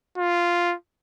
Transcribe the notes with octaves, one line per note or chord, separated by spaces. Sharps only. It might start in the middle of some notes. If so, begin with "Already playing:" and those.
F4